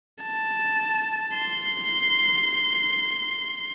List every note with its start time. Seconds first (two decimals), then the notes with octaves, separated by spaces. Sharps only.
0.23 A5
1.37 C6